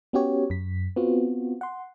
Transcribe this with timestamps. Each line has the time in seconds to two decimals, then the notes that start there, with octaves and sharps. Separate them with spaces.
0.13 B3 C#4 F#4 G4 C#5
0.50 F#2 B6
0.96 B3 C4 F4 F#4
1.61 F#5 C6